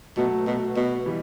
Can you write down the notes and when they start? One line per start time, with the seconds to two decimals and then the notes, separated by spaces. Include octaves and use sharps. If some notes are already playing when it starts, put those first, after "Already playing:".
0.17 B2 F#3 A3
0.47 B2
0.76 B2
1.06 E3 G3